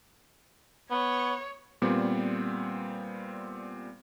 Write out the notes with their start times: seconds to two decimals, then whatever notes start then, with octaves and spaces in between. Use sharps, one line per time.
0.91 B3 C#5
1.82 A#2 G3 B3 C4